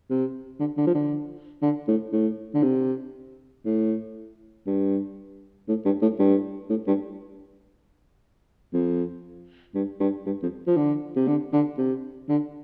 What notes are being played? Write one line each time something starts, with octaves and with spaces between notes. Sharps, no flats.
C3
D3
D3
F3
D3
D3
A2
A2
D3
C3
A2
G2
A2
G2
A2
G2
A2
G2
F2
G2
G2
G2
F2
F3
D3
C3
D3
D3
C3
D3